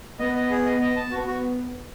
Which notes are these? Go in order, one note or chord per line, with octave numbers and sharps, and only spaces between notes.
B3 D#5
D#5
G#4
D#5
D#5
A5
B3 F#4
F#4